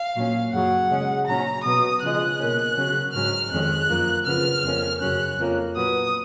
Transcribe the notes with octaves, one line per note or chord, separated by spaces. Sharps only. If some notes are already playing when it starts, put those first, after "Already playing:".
Already playing: F5
A#2 F#3 C#4
F#2 C#3 F#3 F#5
C#3 G#3 C#4
A#2 F#3 C#4 A#5
B2 F#3 B3 D#6
C#3 F3 G#3 F#6
B2 A#3 C#4
C#3 F#3 C#4
G#2 F#3 C#4 F6
F2 D#3 G#3 C#4 F#6
F#2 F3 A#3
C#3 F3 B3 F6
F2 F3 A#3 C#4
F#2 C#3 F#3 C#4 F#6
F2 F3 A#3 C#4
A#2 F#3 B3 D#6